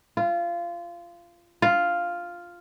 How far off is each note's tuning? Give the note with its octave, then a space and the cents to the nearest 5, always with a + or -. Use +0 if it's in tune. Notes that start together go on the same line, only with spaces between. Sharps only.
F4 -20
F4 +0